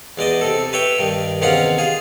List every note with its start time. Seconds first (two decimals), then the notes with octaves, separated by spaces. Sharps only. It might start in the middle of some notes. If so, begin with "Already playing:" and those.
0.18 E2 G#3 D5 D#5
0.41 C3 A4
0.73 B4 C#5 E5 G5 B5
0.99 G2 D#3
1.42 E2 C3 D#3 C#4 F4 F#5
1.78 F4 G#4